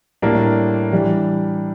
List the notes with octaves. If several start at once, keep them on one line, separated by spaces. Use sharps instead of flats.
A2 G3 A#3 D4
E3 G3 D4